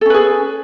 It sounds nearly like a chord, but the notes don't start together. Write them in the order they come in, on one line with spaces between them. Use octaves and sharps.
A4 C#4 B4 G#4